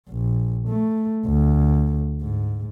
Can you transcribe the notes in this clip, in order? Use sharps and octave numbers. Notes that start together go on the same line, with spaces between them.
A#1
A3
D2
G#2